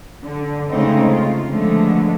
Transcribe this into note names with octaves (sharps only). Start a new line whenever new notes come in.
D3
C#3 G#3 A3 C4 D#4
F4
D3 F3 G#3 A3 B3